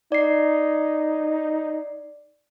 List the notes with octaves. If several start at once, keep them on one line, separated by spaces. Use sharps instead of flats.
D#4 D5 C7